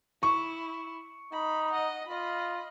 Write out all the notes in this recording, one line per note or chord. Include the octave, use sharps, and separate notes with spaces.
E4 C#6
D#4 B5
D#5 F#5
F4 D#5 B5